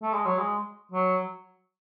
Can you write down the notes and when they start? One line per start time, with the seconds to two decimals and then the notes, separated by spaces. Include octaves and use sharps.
0.02 A3
0.14 G#3
0.26 F#3
0.38 G#3
0.92 F#3